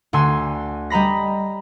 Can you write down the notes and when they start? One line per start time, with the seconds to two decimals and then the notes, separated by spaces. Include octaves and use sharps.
0.13 D2 D3 G#5 C6 E6 G#6
0.90 G3 D#5 A#5 B5 A#6